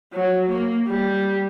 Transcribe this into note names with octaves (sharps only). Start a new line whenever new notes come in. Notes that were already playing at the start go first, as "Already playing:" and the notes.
F#3
A#3
G3